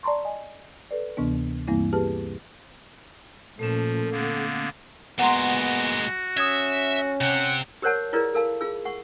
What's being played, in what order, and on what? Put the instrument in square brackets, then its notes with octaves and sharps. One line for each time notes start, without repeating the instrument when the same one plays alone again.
[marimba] D5 A5 A#5 C6 C#6
D#5 G#5
A4 B4 D5
D2 C3 E3 B3 D4
G2 E3 G3 A#3 C4 E4
G4 G#4 B4 A5 F6
[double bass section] A#2 [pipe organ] F3 [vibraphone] A3 C#4 [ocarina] A4
[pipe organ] D3 A#3 B3
[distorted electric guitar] A#2 G#3 [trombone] B3 [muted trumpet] F#4 [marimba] F#5 A#5 C6
[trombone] C#4 [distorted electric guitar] E5 [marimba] D#6 G#6
[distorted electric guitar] C3 C4 [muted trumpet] F#5
[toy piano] G4 A#4 C5 C#5 F#5 A5
E4 F4 G#4 A#4 B4 D5
A4 A#4 F5 A5
F4 G#4 E6
F#5 C#6